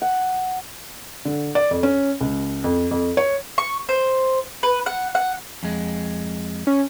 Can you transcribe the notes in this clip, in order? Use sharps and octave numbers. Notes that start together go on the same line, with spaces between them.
F#5
D3
D5
F2
C#4
C#2
F2
F2
C#5
C#6
C5
B4
F#5
F#5
F2 G#3
C#4